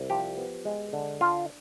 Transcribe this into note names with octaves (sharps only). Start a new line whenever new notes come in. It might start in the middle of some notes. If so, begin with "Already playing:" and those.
Already playing: C2
F3 G4
B3
G#3
D3
D4 F4